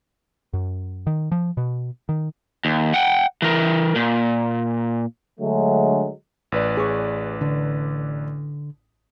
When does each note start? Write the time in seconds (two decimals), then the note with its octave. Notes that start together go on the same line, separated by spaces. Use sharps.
0.53 F#2
1.07 D#3
1.32 F3
1.57 B2
2.09 D#3
2.65 D#2
2.94 F#5 G5
3.42 E3 A#4
3.96 A#2
5.40 D3 F#3 G#3 A3
6.52 A1 B4 D5
6.77 G#4 C#5
7.41 D3